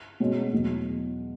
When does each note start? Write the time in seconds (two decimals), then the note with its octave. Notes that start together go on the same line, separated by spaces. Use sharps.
0.20 B2 G#3 C#4
0.53 E2 B2 F#3